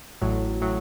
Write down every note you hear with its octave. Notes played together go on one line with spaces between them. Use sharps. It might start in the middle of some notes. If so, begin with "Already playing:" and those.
A1 A2 F#3
A2 F#3